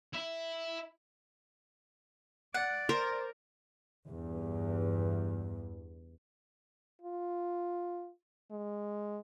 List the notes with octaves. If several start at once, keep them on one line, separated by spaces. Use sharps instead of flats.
E4 E5
D5 F#5
A#4 C5
E2 G2
F4
G#3